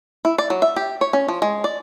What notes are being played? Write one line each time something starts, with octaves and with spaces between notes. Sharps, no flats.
E4
D5
F#3
E5
G4
C#5
C#4
F3
G#3
D5